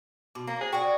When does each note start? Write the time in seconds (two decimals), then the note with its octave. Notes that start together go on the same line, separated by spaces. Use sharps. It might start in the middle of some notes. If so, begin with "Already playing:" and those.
0.35 B2 F#4 D6
0.47 A#3 C#4
0.61 G#4 C5
0.72 F#4 G#4 A#4 D5 G5